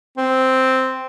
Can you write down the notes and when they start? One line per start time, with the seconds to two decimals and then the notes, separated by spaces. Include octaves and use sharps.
0.17 C4